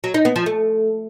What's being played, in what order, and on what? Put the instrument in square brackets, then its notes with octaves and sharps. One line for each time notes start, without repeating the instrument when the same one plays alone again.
[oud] F#3
D#4
B3
F3
A3